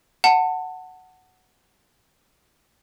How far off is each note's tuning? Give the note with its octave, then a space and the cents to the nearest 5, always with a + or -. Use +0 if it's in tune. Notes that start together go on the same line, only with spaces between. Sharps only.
F#5 +0 A5 +25